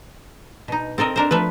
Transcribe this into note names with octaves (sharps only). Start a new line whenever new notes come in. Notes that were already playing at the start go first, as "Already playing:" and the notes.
B2 D#4
C4 A4 A#4 D#5
D4 A#4 C5
F3 A3 B4